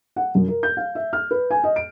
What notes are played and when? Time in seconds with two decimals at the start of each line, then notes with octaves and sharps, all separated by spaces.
0.16 F#5
0.35 F#2
0.48 A#4
0.63 G6
0.77 F5
0.95 E5
1.13 F6
1.31 B4
1.51 G#5
1.64 D#5
1.76 D7